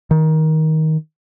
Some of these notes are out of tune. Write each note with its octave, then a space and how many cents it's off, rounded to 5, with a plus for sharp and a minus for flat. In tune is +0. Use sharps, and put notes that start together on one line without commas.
D#3 +15